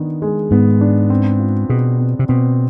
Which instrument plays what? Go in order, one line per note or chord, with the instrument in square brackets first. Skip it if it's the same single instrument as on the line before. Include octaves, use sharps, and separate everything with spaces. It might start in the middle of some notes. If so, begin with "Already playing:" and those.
Already playing: [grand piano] D#3 B3 D4
G#3
[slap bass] G#2 [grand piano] B3
[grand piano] D4
C4
F4
[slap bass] B2 [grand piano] G#4
[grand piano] C4
[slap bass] C3
[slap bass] B2 [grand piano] C4